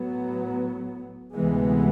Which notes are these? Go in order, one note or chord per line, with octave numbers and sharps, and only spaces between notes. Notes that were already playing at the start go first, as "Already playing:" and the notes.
Already playing: A2 F#3 B3
D2 C3 E3 G#3 B3